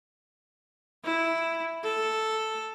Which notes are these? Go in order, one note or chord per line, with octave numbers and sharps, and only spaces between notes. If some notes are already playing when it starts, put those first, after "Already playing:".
E4
A4